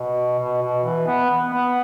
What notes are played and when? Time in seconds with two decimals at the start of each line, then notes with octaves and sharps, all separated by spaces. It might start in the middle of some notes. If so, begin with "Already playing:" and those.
Already playing: B2
0.39 B2
0.62 B2
0.84 E3
1.07 B3
1.30 B3
1.53 B3